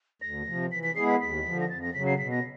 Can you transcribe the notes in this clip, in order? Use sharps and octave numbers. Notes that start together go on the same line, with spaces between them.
D2 A#6
C3 F3
E3 B6
B6
G#3 B3 E4 G#4 C7
B6
D#2 B6
D3 F3
A#6
F2 A6
A#6
C#3 F#3 B6
C7
B2 B6
A#6